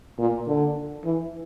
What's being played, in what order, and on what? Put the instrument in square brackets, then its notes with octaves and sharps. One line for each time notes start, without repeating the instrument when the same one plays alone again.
[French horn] A#2
D3
E3